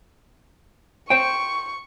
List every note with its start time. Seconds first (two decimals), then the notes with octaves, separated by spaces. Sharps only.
1.10 C5 G5 C#6